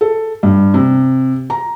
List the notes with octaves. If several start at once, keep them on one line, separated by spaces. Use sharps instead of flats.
A4
G2
C3
A#5